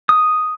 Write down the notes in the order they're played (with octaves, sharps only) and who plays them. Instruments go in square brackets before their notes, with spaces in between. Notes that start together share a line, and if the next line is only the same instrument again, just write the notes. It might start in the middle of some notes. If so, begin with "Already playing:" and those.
[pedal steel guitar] D#6